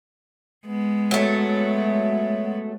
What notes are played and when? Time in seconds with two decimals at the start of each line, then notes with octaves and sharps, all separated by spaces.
0.67 G#3 B3
1.11 F#3 A3